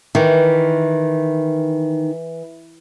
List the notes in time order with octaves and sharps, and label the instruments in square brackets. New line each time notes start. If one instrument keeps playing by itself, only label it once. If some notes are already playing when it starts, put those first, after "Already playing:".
[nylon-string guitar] D#3 [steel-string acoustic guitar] E3